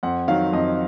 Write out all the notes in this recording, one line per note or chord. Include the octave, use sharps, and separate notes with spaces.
F2 F#5
D#3 F#3 F5
F2 D#5